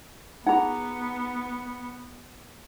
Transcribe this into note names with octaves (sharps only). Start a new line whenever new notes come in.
B3 D#4 F4 G#4 F#5 A#5